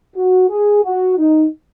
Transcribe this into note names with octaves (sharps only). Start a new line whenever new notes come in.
F#4
G#4
F#4
D#4